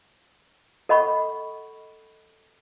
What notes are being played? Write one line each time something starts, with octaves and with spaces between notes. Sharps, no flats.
A4 D#5 F#5 B5 C#6